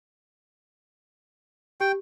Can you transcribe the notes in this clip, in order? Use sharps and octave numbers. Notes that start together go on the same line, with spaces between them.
G4 G5